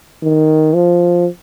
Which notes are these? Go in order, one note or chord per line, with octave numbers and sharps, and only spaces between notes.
D#3
F3